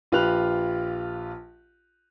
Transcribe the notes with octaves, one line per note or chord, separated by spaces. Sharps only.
A#1 F4 G4 B4 F#6 F7